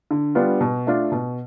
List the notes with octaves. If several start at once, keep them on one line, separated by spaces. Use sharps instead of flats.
D3
G3 B3 D4 F4
B2
A3 D4 F4
B2